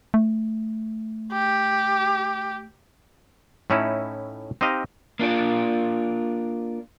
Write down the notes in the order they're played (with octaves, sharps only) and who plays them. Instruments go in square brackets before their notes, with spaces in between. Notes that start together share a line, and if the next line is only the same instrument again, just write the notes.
[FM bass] A3
[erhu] G4
[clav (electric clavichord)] A2 A3 C#4 D#4 E4
C4 D#4 G4 D#5 F5
[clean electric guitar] A#3 D4 F4 D5